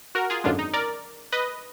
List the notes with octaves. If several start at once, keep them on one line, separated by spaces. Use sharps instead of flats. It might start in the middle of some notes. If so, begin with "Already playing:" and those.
F#4 A#4
F4 G#4
G#1 F#2 D3 G#3 D4 F4
D#4
A#4 D5
B4 D#5